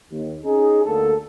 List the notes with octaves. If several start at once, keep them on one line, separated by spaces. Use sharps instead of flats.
D#2
C#4 D#4 G#4
D2 D3 A#3 A4